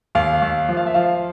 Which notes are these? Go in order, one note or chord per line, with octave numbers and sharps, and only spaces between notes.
D#2 F5
D#2
F3
F5
E5
F3 F5